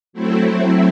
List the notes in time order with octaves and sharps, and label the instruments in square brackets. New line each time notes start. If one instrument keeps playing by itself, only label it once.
[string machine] F#3 A3 C4 E4